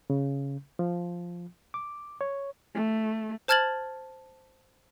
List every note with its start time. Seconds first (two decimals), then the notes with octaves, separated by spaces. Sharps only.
0.10 C#3
0.79 F3
1.74 D6
2.21 C#5
2.75 A3
3.48 C5 A5 F6 G#6 A6 F#7